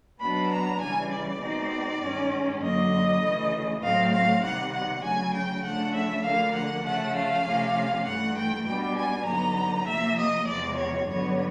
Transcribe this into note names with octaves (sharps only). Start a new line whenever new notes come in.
B2 F#3 B3 D4 B5
A#5
C#3 E3 G3 G#5
D5
B2 G#3 C4 D#4
G2 D#3 G#3 C#4
F#2 D3 F#3 A#3 D#5
D2 C#3 E3 A3
A2 F#3 A3 C4 F5
F5
C3 D#3 G3 F#5
F#5
D2 C#3 F#3 G#5
G5
C#3 F3 A3 D4 F#5
E5
D2 D3 F3 A#3 F5
F#5
C#3 F3 A3 F#5
F5
C3 F3 A3 C#4
G2 E3 A3 F#5
G5
B2 G3 B3 D4 G5
G#5
G2 D3 F#3 B3 D#4 A#5
C3 F3 A#3 E5
D#5
E2 C3 F3 G#3 D5
C#5
G2 D3 F#3 B3 C#5